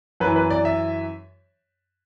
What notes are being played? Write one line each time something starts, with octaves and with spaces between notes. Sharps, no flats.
F#2 E3 B4
B4
D5
E5